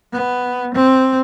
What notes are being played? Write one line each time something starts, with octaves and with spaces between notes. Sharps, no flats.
B3
C4